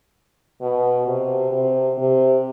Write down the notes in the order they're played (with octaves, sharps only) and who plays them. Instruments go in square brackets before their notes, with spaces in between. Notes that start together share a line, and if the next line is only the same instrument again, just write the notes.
[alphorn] B2
C3
C3
C3